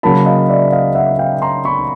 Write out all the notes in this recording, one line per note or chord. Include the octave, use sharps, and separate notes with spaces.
C#3 F#3 A#3 A5 B5
D#5 F5
D5 E5
D#5 F5
E5 F#5
F5 G5
A#5 C6
B5 C#6